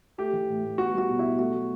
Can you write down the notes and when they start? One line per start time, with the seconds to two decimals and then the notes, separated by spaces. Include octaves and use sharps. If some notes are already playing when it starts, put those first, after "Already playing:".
0.18 A3 G4
0.33 E3
0.49 A2
0.64 A2
0.78 B3 F#4
0.93 G3 F#4
1.09 B2
1.19 E4
1.24 B2
1.39 A3 F#4
1.54 F#3